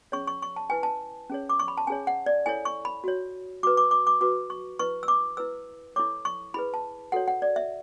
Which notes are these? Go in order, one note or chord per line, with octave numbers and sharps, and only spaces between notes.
C#4 G#4 C#5 C#6
C#6
C#6
A5
E4 B4 G#5
A5
C#4 G#4 C#5
D6
C#6
B5
A5
C#4 G#4 C#5 G#5
F#5
D5
E4 A4 C#5 G#5
C#6
B5
F#4 C#5
F#4 B4 D6
D6
D6
D6
F#4 B4 D6
C#6
E4 B4 C#6
E6
D6
E4 B4 E6
E4 A4 C#5 D6
C#6
E4 G#4 B4 B5
A5
F#4 A4 C#5 F#5
F#5
D5
E5